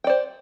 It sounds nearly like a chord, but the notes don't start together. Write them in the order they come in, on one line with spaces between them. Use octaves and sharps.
G5 D5 C5